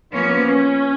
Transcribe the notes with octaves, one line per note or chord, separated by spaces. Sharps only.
F3 A#3 B3 C#4
C#4